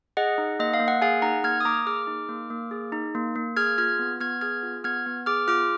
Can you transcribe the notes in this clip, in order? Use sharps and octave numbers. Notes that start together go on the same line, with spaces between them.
G#4 D#5 F#5
D#4
A#3 D#5
F5
A#3
F#5
G#4 F5 G#5
D#4 F#5 A#5
A#3 F6 G#6
D#6
A#3 A#5 D6
G#4 D6 F6
D#4
A#3
A#3
G#4
D#4
A#3
A#3
G#4 F6 G#6
F4 F6 G#6
B3
B3 F6 G#6
G#4 F6 G#6
F4
B3 F6 G#6
B3
G#4 D6 F6
F4 D6 F6